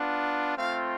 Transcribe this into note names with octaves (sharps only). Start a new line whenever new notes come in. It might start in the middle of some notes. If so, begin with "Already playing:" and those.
Already playing: B3 D4 F4
A3 C4 F4 F5